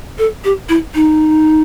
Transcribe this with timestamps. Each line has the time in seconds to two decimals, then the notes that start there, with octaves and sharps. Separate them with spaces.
0.18 A4
0.44 G4
0.69 E4
0.95 D#4